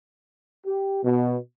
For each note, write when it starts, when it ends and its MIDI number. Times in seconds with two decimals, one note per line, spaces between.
0.66 1.00 67
1.03 1.37 47